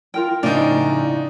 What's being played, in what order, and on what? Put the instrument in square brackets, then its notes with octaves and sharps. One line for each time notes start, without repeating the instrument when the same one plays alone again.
[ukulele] F4 A#4 G5
[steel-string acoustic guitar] F2 A2 C#3 [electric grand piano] D4 D#4 [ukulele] D5